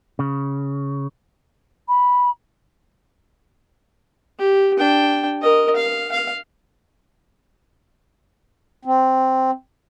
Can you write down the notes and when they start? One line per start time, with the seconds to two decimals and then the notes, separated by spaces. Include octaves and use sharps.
0.19 C#3
1.88 B5
4.39 G4
4.78 D4 G5
5.42 A#4 D#5
5.76 F5
6.12 F5
8.85 C4